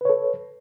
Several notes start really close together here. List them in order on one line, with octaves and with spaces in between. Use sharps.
B4 C#5 A4